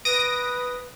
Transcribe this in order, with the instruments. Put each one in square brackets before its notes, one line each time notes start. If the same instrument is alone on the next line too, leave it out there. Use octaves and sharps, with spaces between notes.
[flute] B4 [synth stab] D#6 A#6 D7